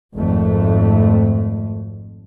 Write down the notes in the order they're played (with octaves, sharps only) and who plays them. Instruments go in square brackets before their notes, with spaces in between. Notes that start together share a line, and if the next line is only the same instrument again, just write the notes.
[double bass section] G#1 F2 A3